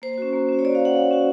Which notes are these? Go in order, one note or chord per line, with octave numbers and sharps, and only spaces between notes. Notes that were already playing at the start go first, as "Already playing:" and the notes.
A#3 C5
C#4 F#4
A#3
C#4 F#4
C#5
A#3 D5
F5
C#4
F#4 F#5
A#3 F5
C#4 F#4